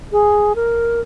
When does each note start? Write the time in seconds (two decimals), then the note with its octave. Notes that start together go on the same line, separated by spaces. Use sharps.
0.12 G#4
0.56 A#4